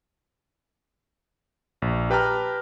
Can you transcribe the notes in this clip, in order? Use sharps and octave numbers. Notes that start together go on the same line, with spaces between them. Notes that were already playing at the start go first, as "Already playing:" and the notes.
A#1
G4 B4 G5 A5 A#5 F6